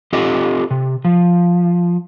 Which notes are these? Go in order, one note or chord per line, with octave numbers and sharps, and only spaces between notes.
C4 F4 G4 A4 D#5
C3
F3